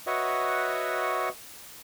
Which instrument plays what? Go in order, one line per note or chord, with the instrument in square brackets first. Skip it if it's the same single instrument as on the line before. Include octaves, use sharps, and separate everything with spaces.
[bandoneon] F#4 B4 C#5 D#5 E5 F#5